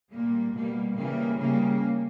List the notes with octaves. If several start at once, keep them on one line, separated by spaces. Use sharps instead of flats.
A#2 G3 A#3
B2 G3 A#3
C#3 E3 G3 A#3
C#3 G3 A#3